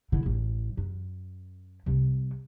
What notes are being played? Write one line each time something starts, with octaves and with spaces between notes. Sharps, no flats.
D3 E4
A1
F#2
C2 C3